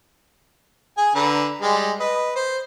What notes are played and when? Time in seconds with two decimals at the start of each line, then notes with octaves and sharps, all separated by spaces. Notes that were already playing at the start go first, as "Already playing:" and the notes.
0.97 G#4 G#5
1.15 D3 B4 A#5
1.62 G3 G#3
2.00 B4 D#5
2.36 C5